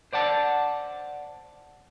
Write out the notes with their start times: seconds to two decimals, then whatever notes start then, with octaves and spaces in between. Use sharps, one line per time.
0.13 C5 D5 F#5 A5